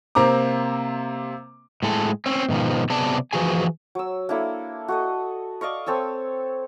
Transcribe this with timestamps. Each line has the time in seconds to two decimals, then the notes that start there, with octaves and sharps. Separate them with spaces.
0.15 C3 A#3 C4 A#5 D6
1.83 A2 G#3 A4
2.26 C4 C#4
2.49 G#2 B2 D#3 F3
2.90 C3 F#3 B3 G#4 D5 A5
3.33 E3 F3 F#4 G#4 G#5
3.95 F#3 E6
4.29 A#3 D4 E4 A4
4.88 F#4 A4 D#5
5.61 D5 D#5 F5 C#6
5.86 C4 A4 C#5 E6